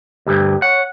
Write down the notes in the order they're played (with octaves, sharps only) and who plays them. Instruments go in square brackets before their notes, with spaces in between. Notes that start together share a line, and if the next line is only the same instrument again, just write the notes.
[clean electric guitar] D2 G2 [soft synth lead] G4
[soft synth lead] C#5 [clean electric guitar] F#5